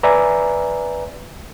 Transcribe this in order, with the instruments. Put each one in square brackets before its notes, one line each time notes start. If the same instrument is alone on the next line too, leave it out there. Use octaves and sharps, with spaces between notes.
[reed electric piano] B4 D5 E5 G#5 A#5